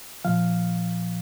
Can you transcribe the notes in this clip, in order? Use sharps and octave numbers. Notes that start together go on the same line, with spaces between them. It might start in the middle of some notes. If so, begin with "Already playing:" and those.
A#2 F3 F5